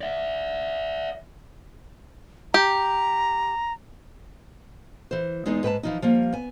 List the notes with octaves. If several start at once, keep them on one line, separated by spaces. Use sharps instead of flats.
D5 E5
G4 A#5
E3 C5
E2 G#3 B3 D#4 G#4
G#2 B4 G5 A5
E3 F3 D#4
F3 G3 A#3
B3 G#5